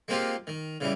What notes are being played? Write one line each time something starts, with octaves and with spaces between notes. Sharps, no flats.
G#3 A#3 C4 F4 G4
D#3
C#3 E3 G3